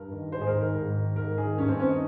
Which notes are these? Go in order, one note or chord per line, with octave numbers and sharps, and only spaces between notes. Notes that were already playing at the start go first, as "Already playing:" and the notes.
Already playing: G2 A#4
D#3
G#2 C5
G#4
A#4
D#3
A#4
G#2
D#3
G#2 A#4
D#3 G#4
G2 C#4
C4
D#3 C#4
D#4